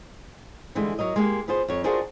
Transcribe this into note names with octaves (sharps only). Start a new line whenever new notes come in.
D3 E3 G3 G#3
F#3 A#4 D#5
G#3 A#3 G4
B3 F4 G#4 C5
F2 C#5
D4 F4 F#4 G#4 A#4 C5